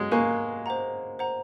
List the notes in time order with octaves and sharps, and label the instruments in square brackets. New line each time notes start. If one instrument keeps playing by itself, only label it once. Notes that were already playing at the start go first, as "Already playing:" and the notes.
Already playing: [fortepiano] F#3 G#3
[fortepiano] A#3 [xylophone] F5 G#5 C#6 F#6
[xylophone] C5 F#5 A#5
C5 F#5 A#5